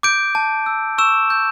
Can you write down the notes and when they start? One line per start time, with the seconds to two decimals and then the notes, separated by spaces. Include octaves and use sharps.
0.03 D6 G6 D7
0.35 A5
0.66 E6
0.98 C#6 E6 E7
1.30 G6